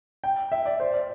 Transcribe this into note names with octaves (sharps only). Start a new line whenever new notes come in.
G5
E5
D5
C5
D5